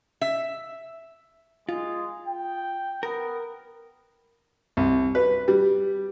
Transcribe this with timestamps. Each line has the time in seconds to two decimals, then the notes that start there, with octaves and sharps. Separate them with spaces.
0.21 E5
1.69 G#3 F4
2.27 G5
3.03 B3 A#4
4.77 C2
5.15 B4
5.48 G3